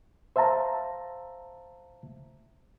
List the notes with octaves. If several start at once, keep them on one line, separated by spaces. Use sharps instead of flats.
C5 E5 F5 A5 A#5